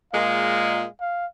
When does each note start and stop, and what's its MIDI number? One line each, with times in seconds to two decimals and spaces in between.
0.13 0.85 46
0.13 0.85 56
0.13 0.88 77
1.01 1.27 77